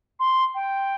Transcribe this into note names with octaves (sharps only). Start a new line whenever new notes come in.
C6
G5